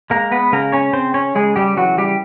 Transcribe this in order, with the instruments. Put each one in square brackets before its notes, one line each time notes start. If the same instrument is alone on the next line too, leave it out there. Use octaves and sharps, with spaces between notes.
[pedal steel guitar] G#3 A#3 A#4
B3 B4
C#3 A#3 A#4
C#4 C#5
C#3 C4 C5
C#4 C#5
C#3 G#3 G#4
G3 G4
E3 F#3 F#4
G3 G4